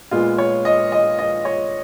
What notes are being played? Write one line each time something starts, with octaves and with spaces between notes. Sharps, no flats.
A#2 G#3 B3 F4
C#5
D#5
D#5
D#5
C#5